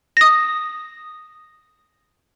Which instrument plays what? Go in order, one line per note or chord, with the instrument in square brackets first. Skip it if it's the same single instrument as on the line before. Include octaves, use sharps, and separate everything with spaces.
[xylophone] D#6 A#6